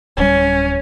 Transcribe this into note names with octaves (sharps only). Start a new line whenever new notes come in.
D1 G3 C#4